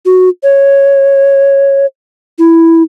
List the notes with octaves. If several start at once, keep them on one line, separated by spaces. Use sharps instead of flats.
F#4
C#5
E4